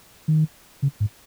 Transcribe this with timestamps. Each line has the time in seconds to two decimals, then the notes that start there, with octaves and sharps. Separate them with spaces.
0.28 D#3
0.82 C#3
1.00 G#2